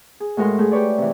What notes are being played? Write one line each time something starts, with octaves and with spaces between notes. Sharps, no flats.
G#4
A2 G#3 F#4 A#4 D#5 C6
A3 G#4
G4 B4 C#5 D5
C3 E3